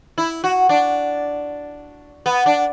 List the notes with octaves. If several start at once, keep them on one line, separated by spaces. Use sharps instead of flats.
E4
F#4
D4
B3
D4